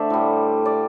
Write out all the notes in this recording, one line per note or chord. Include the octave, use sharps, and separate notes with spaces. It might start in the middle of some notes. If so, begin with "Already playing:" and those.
Already playing: D3 A3 C5 D5 E5
A2 G3
D5